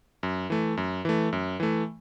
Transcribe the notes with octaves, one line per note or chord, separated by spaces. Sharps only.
F#2
E3 A3
F#2
E3 A3
F#2
E3 A3